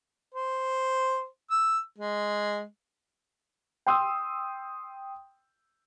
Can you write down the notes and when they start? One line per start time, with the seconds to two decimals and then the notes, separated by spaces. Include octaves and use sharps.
0.34 C5
1.50 E6
1.98 G#3
3.86 G5 C6 D#6 E6